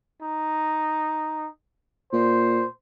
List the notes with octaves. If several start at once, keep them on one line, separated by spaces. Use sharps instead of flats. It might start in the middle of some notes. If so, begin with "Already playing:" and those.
D#4
A#2 C5